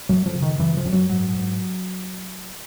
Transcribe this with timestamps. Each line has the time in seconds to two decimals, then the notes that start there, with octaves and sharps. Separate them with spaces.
0.09 F#2 F#3
0.26 F3
0.35 C#3
0.42 D#3
0.59 F#2 E3
0.77 F3
0.85 F#2
0.92 F#3
1.09 G#2 F#3
1.35 G#2